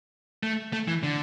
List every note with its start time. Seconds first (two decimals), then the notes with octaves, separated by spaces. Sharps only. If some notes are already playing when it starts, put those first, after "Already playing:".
0.43 A3
0.73 A3
0.88 E3
1.03 D3